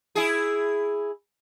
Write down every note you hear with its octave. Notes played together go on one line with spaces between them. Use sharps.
E4 G#4